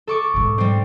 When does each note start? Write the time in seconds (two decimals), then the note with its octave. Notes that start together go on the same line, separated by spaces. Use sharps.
0.07 A4 C#6 D6
0.34 G#2 B2
0.58 G3 C4